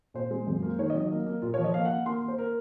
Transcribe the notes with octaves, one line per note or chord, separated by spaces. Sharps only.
A#2 C5
G#3
F#2
A#3
D#3 C#5
D#5
F#3
D#5
A#3
A#3
A#2 F4
F3 C#5
D#5
A#3 F5
F#5
A#3
A#3 C6
A#3
C5
A#4